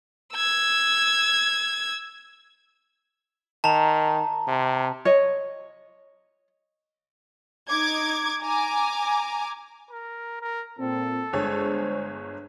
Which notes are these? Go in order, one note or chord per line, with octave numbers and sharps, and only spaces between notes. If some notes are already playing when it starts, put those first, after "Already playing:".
E6 G#6
D#3 A5 A#5
C3
C#5 D#5
D#4 D6 G#6
G#5 A#5 D6
A#4
A#4
A#2 C4 A4
G1 G#3 D4 G#4 C5 C#5